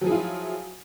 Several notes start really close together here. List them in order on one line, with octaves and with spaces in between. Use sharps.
F#3 F3 G#4 E4 F4